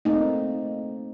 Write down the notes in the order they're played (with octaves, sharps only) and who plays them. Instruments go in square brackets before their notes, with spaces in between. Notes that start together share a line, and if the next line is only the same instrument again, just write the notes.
[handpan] A3 A#3 C4 D#4